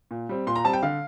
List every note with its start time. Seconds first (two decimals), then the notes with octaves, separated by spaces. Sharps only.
0.11 A#2
0.29 G3 C4
0.47 A#2 C6
0.56 A#5
0.64 G3 C4 A5
0.73 G5
0.83 D3 F5